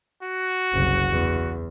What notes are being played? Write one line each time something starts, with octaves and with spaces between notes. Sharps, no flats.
F#4
F#1 C2
E2